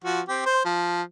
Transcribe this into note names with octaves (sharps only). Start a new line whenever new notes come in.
F3 F#4
C4 G4
C5 C6
F3